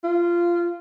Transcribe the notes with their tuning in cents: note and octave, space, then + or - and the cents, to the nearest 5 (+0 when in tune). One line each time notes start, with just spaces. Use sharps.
F4 -15